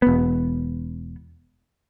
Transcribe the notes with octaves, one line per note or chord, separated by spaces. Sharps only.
E1 B3